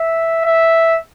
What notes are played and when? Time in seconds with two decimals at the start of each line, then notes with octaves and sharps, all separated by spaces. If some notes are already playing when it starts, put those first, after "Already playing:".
Already playing: E5
0.45 E5